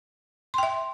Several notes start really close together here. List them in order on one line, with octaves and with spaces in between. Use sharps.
C6 G5 E5